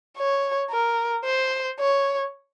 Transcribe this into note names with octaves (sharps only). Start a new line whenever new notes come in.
C#5
A#4
C5
C#5